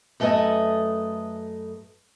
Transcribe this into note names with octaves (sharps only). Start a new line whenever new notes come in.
F#2 A3 A4 B4 D#5 G#5